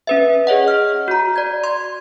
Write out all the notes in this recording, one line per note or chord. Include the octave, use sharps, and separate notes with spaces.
C#4 B4 E5
G#4 C#5 D#5 F#5
F6
F#4 A#5
D5 G#6
C6 G#6